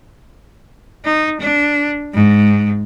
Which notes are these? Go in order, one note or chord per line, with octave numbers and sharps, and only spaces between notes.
D#4
D4
G#2